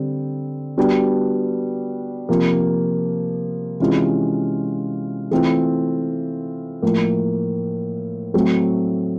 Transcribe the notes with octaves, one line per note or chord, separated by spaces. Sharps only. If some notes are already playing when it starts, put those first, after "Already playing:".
Already playing: D3 G3 C4
G3 B3 D4 F#4
C3 F3 A#3
C3 E3 G#3 C#4 F4
E3 A3 C4 F4
A2 F3 A#3
A2 F#3 A3 C4